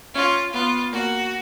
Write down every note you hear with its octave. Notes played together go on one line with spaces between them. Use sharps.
C#4 F4
B3 F4
A#3 F#4